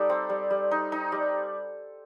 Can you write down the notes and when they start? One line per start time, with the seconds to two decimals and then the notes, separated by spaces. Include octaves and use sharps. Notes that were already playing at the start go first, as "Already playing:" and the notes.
Already playing: G3 D#4 A4
0.10 C4
0.29 G3
0.50 G3
0.71 D#4
0.92 D#4
1.12 G3